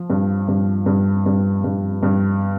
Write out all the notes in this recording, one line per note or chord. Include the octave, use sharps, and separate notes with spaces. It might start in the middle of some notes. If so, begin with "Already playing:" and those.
Already playing: F3
G2
G2
G2
G2
G2
G2